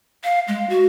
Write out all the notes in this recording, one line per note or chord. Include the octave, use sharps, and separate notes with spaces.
F5
G#3
F#4